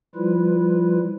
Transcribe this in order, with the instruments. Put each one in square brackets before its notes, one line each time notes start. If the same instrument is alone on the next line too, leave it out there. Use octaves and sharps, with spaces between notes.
[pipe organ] F3 G3 E4 F4 B4